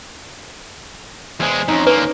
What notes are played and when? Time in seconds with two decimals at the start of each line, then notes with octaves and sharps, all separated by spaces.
1.40 E2 G#3 C5 G#5
1.68 F2 C#4 D#4
1.87 D3 A#3 B4